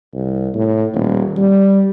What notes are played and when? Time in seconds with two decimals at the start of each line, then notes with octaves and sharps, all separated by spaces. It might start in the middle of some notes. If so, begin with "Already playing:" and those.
0.14 C2
0.55 A2
0.94 D#1
1.37 G3